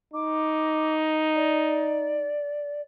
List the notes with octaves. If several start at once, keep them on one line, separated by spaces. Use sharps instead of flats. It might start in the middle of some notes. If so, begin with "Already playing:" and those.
D#4 D6
D5